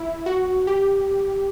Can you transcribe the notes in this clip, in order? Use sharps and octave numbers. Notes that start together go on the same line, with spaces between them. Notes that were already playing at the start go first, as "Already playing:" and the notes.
Already playing: E4
F#4
G4